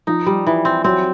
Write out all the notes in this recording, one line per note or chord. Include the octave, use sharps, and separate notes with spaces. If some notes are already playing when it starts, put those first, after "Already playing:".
F3 D#4
G3
E3
C4
F#3 C4